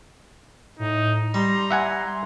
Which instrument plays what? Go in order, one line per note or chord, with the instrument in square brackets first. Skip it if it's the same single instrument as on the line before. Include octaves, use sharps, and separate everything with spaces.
[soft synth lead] A2 [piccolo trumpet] D#4
[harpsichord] G3 [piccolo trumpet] A#5 [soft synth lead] C6
[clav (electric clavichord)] E5 F#5 G#5